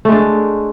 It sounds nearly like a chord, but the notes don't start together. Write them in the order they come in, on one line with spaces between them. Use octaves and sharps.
A3 G#3 D4